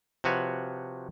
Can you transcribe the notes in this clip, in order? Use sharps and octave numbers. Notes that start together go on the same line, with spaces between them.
C3 F3 F#4 B4 C#5